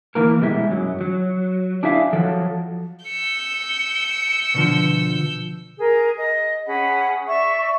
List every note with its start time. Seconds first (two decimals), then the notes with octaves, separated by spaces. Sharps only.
0.15 E3 A#3 A#4
0.41 B2 G3 G#3 E4
0.71 F#2 F#3
1.01 F#3
1.83 D4 E4 G#4 E5 F5
2.13 F3 F#3 A4
3.05 E6 G6 C#7
4.54 B2 D3 F3
5.79 G#4 A#4
6.17 D#5
6.67 C#4 G#4 F#5 B5
7.27 D5 E5 C#6